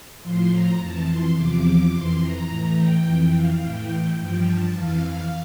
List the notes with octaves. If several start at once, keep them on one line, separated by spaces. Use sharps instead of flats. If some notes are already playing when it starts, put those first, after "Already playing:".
A2 F3 C6
A#5
F2 E3 A5
C6
E2 C3 F3 D6
F2 E3 C6
A#5
A2 E3
G5
F2 E3
F5
A2 E3 G5
G2 F3
A5
F2 E3 F5